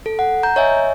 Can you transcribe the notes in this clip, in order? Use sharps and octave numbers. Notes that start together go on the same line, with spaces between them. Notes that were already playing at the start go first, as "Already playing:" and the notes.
A4
F#5
A#5 G6
C#5 D#5 E5 G#5